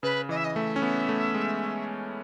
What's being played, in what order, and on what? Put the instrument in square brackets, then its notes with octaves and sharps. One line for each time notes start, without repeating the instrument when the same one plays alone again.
[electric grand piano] C#3 [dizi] B4
[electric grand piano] E3 [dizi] D#5
[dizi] E5
D#5
[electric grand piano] A3 [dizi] E5
[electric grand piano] C#4
B3
A3
G#3